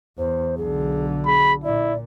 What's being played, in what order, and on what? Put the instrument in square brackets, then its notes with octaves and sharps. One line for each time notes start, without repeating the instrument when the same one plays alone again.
[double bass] E2 [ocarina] C5
[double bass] B1 D3 [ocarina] G#4
[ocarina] G#4 [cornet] B5
[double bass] A#2 [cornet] E4 [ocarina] D5